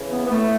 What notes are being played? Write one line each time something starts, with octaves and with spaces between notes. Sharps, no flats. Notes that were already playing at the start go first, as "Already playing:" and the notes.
Already playing: C#3 E3
B3
B3
A2 E3 A3